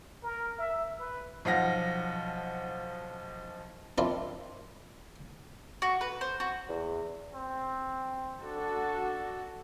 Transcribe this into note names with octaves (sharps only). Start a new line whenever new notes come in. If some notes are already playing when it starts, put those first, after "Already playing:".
A#4
E5
B4
B1 F3 F5 F#5 A#6
D#3 C4 D4 E4 F4
F#4
B4
C5
F#4
E2
C4
D4 F#4 A4